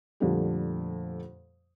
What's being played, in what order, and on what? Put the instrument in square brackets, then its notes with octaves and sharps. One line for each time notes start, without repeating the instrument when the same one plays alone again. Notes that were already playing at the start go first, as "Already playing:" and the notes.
[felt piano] F2 A#2 D3 G3 A3 G4